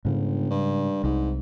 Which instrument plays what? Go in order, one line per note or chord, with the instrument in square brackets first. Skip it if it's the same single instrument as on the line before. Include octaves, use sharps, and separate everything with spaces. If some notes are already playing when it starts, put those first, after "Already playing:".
[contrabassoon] G1 [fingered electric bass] G#2 C#3
[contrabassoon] G2
[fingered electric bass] C2 [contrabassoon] G#2